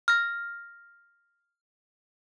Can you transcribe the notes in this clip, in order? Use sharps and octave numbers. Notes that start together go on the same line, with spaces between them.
F6 A#6